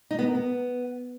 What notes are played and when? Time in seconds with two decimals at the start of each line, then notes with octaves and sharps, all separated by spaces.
0.11 D#4
0.19 B3
0.27 A#4
0.35 B3